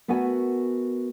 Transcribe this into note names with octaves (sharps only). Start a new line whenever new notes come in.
A3 B3 F#4 A#4 B4 G#5